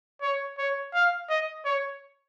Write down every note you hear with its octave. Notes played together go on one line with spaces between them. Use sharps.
C#5
C#5
F5
D#5
C#5